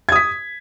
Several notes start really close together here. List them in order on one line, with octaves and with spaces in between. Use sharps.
G#6 D#6 B6